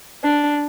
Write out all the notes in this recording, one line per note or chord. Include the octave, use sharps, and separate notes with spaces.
D4